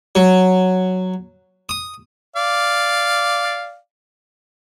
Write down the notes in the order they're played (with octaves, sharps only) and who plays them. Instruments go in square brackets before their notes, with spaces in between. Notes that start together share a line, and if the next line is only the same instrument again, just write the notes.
[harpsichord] F#3
D#6
[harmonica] D5 F5